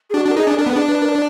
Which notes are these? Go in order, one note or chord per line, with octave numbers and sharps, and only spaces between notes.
G#4
D4 F#4
D4
A#4
D#4 G#4
D4
G#4
D4 A#4
B3
D4 G#4
B4
A#4
D5